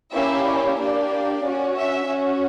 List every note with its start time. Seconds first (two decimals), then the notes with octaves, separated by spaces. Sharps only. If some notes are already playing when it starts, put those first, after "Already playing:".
0.13 A#3 C#4 E4 G4 E5
0.46 D5
0.78 A#3 D4 G4 D5
1.43 C#4 F#4
1.76 E5
2.08 C#4 F#4